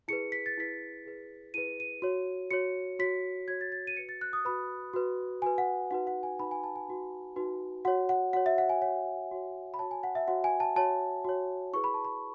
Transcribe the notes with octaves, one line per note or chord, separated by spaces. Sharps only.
E4 G#4 B4 C#7
B6
A6
E4 G#4 B4 B6
E4 G#4 B4
E4 G#4 B4 D#7
D#7
F#4 C#5
F#4 C#5 C#7
F#4 C#5 B6
F#4 C#5 G#6
A6
A6
D#7
F#4 B4 C#7
A6
F#6
D#6
F#4 B4 B5
F#4 B4
F#4 B4 G#5
F#5
D#4 F#4 B4 F#5
F#5
G#5
D#4 F#4 B4 B5
G#5
A5
G#5
D#4 F#4 B4
D#4 F#4 B4
F#4 C#5 F#5
F#5
F#4 C#5 F#5
E5
F#5
G#5
F#4 C#5 F#5
F#4 C#5
B5
F#4 C#5 A5
G#5
F#5
E5
F#4 C#5 F#5
G#5
A5
F#4 C#5 A5
F#4 C#5
E4 G#4 B4 C#6
B5
A5
B5